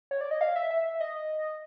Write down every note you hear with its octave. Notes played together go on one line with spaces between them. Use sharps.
C#5
D5
D#5
F5
E5
E5
D#5